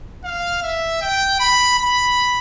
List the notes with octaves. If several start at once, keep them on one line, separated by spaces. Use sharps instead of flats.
F5
E5
G5
B5
B5